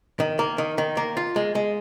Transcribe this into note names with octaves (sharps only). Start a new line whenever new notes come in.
D#3
A#3
D#3
D#3
A#3
F4
G#3
G#3